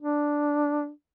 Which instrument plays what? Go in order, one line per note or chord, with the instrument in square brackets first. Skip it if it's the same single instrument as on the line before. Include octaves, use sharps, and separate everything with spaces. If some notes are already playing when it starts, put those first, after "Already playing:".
[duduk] D4